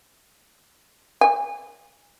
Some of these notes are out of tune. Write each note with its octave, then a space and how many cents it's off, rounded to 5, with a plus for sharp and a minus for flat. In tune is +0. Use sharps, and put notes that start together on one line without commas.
G#5 -35